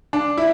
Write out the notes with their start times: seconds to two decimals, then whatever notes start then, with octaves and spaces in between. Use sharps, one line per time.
0.13 D4
0.37 E4